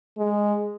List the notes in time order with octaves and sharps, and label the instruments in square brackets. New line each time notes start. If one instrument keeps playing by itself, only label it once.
[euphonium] G#3